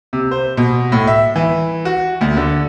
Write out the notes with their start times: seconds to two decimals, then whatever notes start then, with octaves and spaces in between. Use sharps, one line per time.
0.13 C3
0.31 C5
0.57 B2
0.92 A2
1.07 E5
1.36 E3
1.85 F#4
2.21 D2
2.37 D3